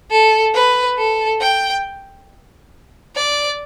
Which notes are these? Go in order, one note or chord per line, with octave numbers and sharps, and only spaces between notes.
A4
B4
A4
G5
D5